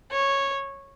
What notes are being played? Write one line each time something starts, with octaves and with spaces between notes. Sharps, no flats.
C#5